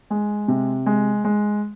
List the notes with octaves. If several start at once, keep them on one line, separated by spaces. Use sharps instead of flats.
G#3
C3
G#3
G#3